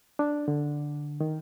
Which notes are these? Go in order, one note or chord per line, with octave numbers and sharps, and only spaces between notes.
D4
D3
D#3